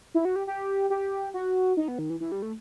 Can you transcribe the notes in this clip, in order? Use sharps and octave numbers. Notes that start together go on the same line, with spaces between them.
E4
F#4
G4
G4
G4
F#4
D#4
B3
D#3
E3
E3
G3
A3